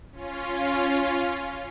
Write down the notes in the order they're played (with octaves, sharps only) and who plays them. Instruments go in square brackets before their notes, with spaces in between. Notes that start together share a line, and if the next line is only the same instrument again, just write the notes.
[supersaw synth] C#4 F4